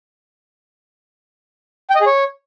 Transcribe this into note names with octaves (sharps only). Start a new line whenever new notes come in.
G5
D#5
G#4
C#5